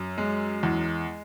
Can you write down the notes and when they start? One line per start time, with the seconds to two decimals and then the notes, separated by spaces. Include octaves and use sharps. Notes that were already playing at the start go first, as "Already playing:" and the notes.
Already playing: F#2
0.18 G#3
0.63 E2